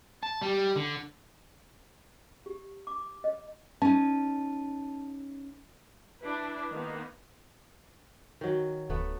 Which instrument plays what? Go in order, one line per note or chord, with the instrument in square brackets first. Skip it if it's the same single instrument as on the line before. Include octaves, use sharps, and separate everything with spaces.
[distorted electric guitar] A5
G3
D3
[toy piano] G4
D6
D#5
[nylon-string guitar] C#4 D#4 [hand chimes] A5
[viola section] D4 E4 B4
D#3 A#3 B3 D#4
[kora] D#3 F#3
[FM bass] D1 [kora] A3 B3 F#5